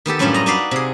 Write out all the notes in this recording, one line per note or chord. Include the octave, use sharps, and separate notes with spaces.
D#3 B3 G4 A4
F#2 A2 G3 C#4 D4 F4
D#5 A#5
D4 D#4 F#4 B4 D5 F5
C3 G#4